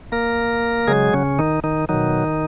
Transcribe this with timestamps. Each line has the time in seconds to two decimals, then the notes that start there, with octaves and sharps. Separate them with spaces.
0.12 A#3 A#4
0.88 C#3 F#3 G#3 G#4
1.14 C#3 C#4
1.39 D#3 D#4
1.64 D#3 D#4
1.89 B2 D#3 F#3 D#4